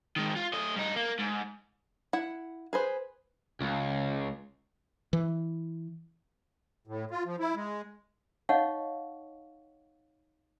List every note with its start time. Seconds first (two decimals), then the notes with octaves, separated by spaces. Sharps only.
0.16 D#3 G#3
0.36 F4
0.53 A3 D#5
0.76 G2 D#4
0.96 A#3
1.19 G#2
2.13 E4 F#5
2.73 G#4 B4 C5
3.60 C#2
5.13 E3
6.87 A2
7.11 F4
7.26 F3
7.40 E4
7.55 G#3
8.49 D#4 C#5 D#5 F5 F#5 C#6